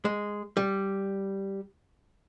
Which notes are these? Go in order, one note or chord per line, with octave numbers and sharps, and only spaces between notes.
G#3
G3